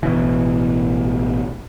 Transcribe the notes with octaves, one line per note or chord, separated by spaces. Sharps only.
A1 B2 E3